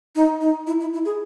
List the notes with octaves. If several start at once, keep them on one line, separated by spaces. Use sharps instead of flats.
D#4
D#4
E4
E4
E4
G#4